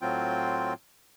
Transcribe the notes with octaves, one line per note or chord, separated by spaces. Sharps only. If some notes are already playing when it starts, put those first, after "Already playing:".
A2 F#3 C4 F4 G5